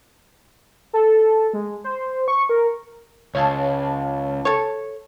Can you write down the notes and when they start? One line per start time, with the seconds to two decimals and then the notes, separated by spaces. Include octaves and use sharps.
0.93 A4
1.53 G#3
1.84 C5
2.28 C#6
2.49 A#4
3.35 C#2 C#5 F5 A5
4.45 A4 C#5